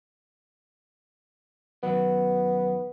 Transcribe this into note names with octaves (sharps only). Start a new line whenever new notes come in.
F#2 D#3 F#3 B3